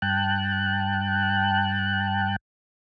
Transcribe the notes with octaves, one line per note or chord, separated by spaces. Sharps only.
G2 G5 A5 F#6